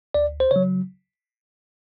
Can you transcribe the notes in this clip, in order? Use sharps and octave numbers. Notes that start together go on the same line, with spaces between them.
D2 D5
C5
C#3 F#3 C#5